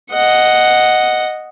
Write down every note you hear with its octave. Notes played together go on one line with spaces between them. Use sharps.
D#5 F#5